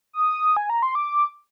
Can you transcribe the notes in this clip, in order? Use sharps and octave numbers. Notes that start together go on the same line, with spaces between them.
D#6
G#5
A#5
C6
D6